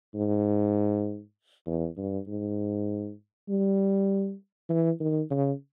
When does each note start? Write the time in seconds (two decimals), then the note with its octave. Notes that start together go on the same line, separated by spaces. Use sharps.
0.15 G#2
1.66 E2
1.97 G2
2.27 G#2
3.49 G3
4.70 E3
5.00 D#3
5.31 C#3